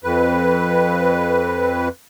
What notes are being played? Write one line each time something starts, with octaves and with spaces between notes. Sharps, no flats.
F2 B4